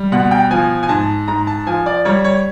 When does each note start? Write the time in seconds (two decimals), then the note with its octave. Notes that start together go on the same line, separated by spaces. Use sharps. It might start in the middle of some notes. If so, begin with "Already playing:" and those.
Already playing: G3
0.12 B2 F#5
0.31 G5
0.51 F3 G#5
0.83 G#5
0.89 G#2 A5
1.28 G#2 A#5
1.47 A5
1.66 F3 G#5
1.86 D5
2.05 G3 C#5
2.24 C#5